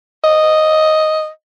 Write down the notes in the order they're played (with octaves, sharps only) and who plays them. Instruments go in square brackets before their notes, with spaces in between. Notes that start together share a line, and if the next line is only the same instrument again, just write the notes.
[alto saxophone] D#5